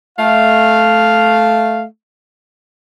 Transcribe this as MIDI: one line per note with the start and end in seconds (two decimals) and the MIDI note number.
0.18 1.83 57
0.18 1.83 77